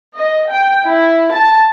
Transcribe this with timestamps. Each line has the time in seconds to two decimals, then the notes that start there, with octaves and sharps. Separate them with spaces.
0.14 D#5
0.50 G5
0.86 E4
1.33 A5